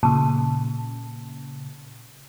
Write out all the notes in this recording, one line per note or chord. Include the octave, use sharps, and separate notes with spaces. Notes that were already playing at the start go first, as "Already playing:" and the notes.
A#2 C#3 A5